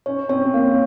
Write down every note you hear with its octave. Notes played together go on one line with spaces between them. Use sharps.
C#4 C#5
C4 C#5
C4
A#3 F5